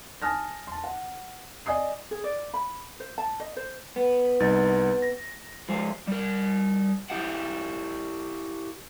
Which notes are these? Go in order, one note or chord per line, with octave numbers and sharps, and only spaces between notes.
G#5 A5 D#6 F6 A#6
A5 C6
F#5
D5 D#5 G#5 D#6 C7
G#4
D5
B5
C5
A5
D#5
C5
B3
C2 D#4 A6
A#6
F3 G#3 C5
G3 A#4
E4 G4 E5 F#5